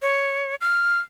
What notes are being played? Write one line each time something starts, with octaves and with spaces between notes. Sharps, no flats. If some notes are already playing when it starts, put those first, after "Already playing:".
C#5
F6